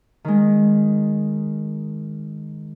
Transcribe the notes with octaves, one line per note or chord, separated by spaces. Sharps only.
D#3 G#3